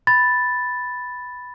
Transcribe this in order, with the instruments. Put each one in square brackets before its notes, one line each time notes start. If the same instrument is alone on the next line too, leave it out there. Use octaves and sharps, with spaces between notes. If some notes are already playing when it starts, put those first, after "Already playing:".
[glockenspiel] B5 A6